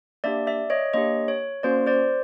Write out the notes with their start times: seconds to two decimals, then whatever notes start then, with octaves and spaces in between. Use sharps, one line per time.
0.24 A#3 D4 G4 D5 E5
0.47 D5 E5
0.70 C#5 D#5
0.93 A#3 D4 G4 C#5 D#5
1.28 C#5
1.63 A#3 C#4 F#4 C5 D5
1.87 C5 D5